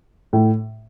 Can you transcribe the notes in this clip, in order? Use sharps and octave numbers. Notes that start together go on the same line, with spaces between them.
A2